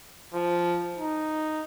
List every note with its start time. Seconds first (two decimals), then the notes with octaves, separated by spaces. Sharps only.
0.33 F3
0.98 D#4